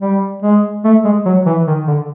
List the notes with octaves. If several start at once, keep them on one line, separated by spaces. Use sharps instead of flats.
G3
G#3
A3
G#3
F#3
E3
D#3
D3